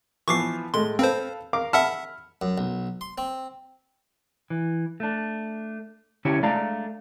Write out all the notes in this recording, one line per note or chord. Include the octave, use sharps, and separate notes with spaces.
E3 F3 B3 C#6 D6 C7
A2 G#3 A3 C6
C4 A4 B4 C5 F5
A#4 F5 D6
E5 F#5 A5 B5 E6 F6
F#2
B1
C6
C4
E3
A3 D4
D3 C#4 E4 G4 C#5
G#3 A3 D4 D5 F5 A#5